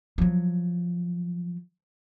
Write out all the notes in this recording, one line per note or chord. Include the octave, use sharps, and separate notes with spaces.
F3 F#3